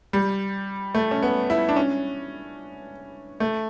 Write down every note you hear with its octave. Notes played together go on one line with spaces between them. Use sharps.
G3
A3
C#4
B3
E4
D4
C#4
A3